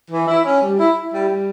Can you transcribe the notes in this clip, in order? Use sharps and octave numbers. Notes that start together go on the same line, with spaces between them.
E3
E4
C#4
G3
E4
E4
G3
G3